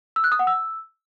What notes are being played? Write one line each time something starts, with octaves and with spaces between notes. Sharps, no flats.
E6
F#6
D#6
F#5
E6